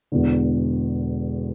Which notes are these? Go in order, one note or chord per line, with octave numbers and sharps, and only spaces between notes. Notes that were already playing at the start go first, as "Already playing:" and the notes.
E1 E2 D3